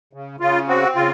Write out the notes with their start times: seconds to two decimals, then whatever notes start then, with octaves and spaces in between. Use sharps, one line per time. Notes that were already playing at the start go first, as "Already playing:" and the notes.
0.13 C#3
0.40 C#3 F4
0.68 C4 F#4
0.95 C#3 F4